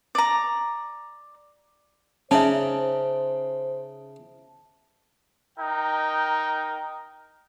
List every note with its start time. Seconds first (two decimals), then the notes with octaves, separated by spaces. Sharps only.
0.15 D5 A#5
2.31 C#3 C#4 D#4 C5 D5 E5 A5
5.59 D#4 A#4 G5